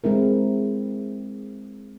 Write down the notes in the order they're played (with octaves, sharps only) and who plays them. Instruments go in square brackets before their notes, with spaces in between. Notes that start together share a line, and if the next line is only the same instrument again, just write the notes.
[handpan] G#3 C4 E4 A#4